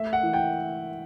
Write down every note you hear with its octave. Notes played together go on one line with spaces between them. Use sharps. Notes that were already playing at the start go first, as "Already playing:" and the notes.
Already playing: A3 E5
F#5
E3
G5